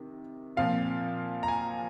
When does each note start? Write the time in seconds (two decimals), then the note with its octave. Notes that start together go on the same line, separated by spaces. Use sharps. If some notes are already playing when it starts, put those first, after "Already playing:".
Already playing: C3 D#3
0.57 A#2 F3 C4 F4 F5
1.43 A#5
1.48 G#5